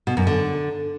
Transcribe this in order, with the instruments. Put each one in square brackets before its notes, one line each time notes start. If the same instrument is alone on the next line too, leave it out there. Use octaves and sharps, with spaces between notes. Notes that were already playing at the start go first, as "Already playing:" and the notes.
[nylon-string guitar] B2
F#2
D3